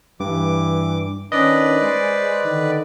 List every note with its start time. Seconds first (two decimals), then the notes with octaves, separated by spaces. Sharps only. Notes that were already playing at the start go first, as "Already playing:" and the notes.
0.20 G2 E3 D6
1.32 D#3 C#4 D4 B4 D5 D#5
1.81 G#3 C5
2.44 D3 D#3